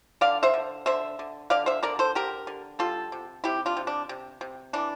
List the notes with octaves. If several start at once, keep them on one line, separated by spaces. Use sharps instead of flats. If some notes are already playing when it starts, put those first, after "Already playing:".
D3 D5 F5
C5 E5
D3
D3 C5 E5
D3
D3 D5 F5
C5 E5
D3 A#4 D5
A4 C5
D3 G4 A#4
D3
G3 F4 A4
C3
C3 E4 G4
D4 F4
C3
D4
C3
C3
E3 D4